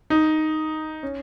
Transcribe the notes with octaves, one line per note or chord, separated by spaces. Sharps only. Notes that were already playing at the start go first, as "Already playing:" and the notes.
D#4
C#4